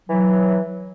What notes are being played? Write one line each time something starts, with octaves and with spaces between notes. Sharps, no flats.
E3 F#3